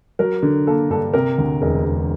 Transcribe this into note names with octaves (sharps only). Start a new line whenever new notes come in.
F#3 A#4
D3
A#3 A4
G2 A4
C3 A#4
D2
E1 A#4
E1